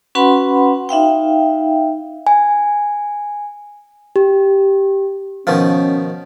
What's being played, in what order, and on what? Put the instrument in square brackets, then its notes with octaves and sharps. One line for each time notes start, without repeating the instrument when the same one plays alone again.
[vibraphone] C#4 F#4 B4 F#5 B5 C6
D#4 E5 F5 G5
[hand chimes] G#5
G4
[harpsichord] B2 D#3 F3 [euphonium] C#4